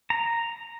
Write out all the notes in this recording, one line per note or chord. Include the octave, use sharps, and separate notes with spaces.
A#5